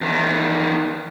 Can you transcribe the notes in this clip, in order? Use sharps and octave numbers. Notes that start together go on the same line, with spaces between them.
E2 D#3